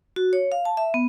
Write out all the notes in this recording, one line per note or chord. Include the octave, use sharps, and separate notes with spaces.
F#4
C#5
F5
A5
E5
B3